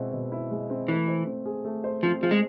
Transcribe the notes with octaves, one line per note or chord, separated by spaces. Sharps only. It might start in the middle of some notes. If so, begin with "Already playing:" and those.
Already playing: B2 G#3 C4 E4
B2
E4
G#3
C4
E3 A3
C5
C4
G#4
A3
C5
F3 C4
F3 G#4
G#3